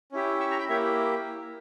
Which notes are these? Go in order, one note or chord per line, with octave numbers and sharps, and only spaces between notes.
C#4 E4 G4
C#6 E6
A#5 C#6
G5 B5
A#3 E4 G4 C#5 E5